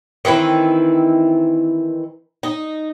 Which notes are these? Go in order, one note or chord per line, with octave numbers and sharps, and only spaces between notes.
D#3 E3 C4 E4
D#4